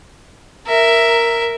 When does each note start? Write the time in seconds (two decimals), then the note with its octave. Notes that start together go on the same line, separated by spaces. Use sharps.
0.67 A#4 E5